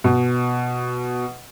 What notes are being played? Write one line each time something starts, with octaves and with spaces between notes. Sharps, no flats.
B2